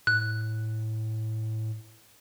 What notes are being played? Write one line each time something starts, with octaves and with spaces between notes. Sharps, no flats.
A2 F#6